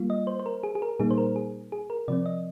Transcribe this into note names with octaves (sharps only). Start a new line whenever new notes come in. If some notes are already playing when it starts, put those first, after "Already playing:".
Already playing: G3 A#3 F4
D#5
C5
C5
A#4
G#4
G#4
A#4
A#2 G3 A#3 D#4 G#4
C5
A#4
G#4
G#4
A#4
C3 F3 C4 D5
D#5